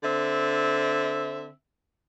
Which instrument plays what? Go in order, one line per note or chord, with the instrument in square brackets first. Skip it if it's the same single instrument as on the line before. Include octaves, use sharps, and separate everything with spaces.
[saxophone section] D3 C4 E5